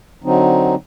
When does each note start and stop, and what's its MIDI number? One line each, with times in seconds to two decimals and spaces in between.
0.24 0.75 50
0.24 0.75 54
0.24 0.75 60
0.24 0.75 63